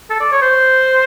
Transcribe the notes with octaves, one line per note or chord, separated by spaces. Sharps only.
A4
D5
C#5
C5